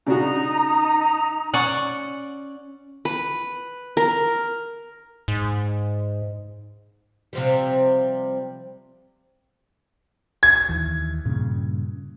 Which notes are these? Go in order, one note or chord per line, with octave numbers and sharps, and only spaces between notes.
C#3 D4 D#4 F#4 A#5
C#4 D5 F#5
B4
A#4
G#2
C3 F3 G3
G#6
D#2 E3
G2 A#2 C#3